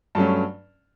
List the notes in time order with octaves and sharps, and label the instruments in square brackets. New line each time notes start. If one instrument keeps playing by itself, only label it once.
[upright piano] G2 F#3 A3 C#4 A5